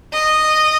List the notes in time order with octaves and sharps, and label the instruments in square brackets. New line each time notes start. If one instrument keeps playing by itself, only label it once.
[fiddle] D#5